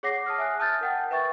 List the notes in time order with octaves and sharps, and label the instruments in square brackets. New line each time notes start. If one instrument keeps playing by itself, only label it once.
[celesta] G#4 C#5 F#5 D6 A#6 C7
A5 D#6 F6
E5 G#5 F#6
A5 D#6 F6 G6 A6
A#4 F#5 G5
B4 E5 G5 C#6 A6